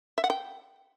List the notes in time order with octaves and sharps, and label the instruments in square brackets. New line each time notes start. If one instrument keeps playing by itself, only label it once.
[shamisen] E5
F#5
G5